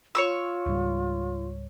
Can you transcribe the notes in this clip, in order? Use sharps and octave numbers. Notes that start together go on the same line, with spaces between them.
F4 C#5 C#6 E6
C#2 G#2 G3